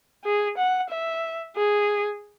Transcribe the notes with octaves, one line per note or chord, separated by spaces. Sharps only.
G#4
F#5
E5
G#4